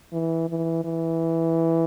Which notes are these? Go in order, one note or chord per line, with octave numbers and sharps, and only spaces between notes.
E3
E3
E3